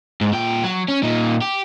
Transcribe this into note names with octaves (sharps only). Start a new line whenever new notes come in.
G#2
A#2 G5
F#3
C#4
A#2 D#4
G4